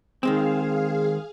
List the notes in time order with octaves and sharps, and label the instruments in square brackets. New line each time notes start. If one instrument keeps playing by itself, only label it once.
[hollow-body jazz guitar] D#3 G#3 C4 [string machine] G#4 F5